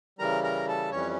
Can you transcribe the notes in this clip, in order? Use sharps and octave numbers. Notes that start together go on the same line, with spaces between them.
C#3 E3 G3 A#4 A#5
A#4 A#5
A4 A5
F2 E3 G3 C#4 C#5